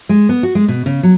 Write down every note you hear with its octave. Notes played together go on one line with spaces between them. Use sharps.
G#3
B3
F#4
G#3
B2
C#3
F#3